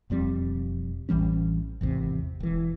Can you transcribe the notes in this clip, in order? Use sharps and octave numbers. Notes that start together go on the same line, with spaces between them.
E1 F2 G3 C4
A1 E3 G3 C#4
G#1 E2 C3
E1 E3